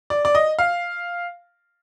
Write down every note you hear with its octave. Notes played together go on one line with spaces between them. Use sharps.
D5
D5
D#5
F5